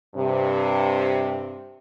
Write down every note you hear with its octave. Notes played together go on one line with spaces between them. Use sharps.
G2 C3